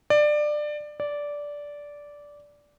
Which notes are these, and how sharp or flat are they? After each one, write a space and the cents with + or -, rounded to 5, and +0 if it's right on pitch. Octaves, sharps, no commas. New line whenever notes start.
D5 +20
D5 -10